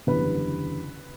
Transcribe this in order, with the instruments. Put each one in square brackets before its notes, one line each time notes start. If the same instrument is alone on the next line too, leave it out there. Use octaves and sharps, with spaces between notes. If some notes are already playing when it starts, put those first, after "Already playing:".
[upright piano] F#1 E2 D3 G3 B4